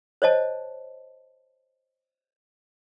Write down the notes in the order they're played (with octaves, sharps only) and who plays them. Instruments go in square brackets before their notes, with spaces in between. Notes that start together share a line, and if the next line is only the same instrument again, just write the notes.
[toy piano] C5 C#5 D#5 A5